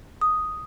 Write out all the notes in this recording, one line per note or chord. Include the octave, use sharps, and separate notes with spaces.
D#6